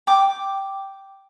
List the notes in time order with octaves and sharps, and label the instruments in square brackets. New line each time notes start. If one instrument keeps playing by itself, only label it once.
[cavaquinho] G5 D6